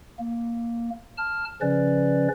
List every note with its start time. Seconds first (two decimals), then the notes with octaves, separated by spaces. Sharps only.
0.19 A#3
1.18 A5 F6
1.61 C#3 F3 C#4 B4 D5